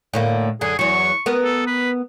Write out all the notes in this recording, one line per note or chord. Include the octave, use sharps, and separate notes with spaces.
A2 D3 A#3
F#2 D3 G#4
E2 F#3 C#6
B3 A#4
A4
B4